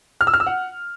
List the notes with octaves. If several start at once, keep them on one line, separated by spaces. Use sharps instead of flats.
F6
E6
F6
E6
F#5